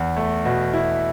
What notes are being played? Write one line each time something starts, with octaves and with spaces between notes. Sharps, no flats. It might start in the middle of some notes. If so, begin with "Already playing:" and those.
Already playing: E2
A3
B2
E4